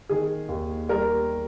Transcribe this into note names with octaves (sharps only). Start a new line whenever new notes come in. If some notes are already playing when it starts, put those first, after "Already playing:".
D#3 G#4
D#2
G3 A#4